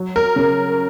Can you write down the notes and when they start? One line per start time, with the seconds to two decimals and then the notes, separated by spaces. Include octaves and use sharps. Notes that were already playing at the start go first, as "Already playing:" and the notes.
Already playing: F#3
0.16 A#4
0.36 C#3